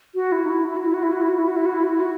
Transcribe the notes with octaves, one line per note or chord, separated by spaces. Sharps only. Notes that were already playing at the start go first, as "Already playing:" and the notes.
F#4
E4
D#4
E4
E4
F#4
E4
F#4
E4
F#4
E4
F#4
E4
F#4
E4
F#4
E4
F#4
E4
F#4